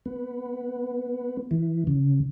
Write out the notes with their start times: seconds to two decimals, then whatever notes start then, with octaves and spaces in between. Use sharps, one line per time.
0.06 B3
1.51 E3
1.87 C#3